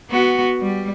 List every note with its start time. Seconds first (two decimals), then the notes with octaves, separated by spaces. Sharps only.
0.10 B3 F#4
0.61 G3